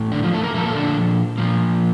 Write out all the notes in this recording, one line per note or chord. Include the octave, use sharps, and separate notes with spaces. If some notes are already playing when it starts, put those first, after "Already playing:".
Already playing: A2 E3 A3
D3 D4
F3 F4
A3 A4
A#3 A#4
A#2 F3 A3 A#3 A4
D3 D4
A#2 F3 A#3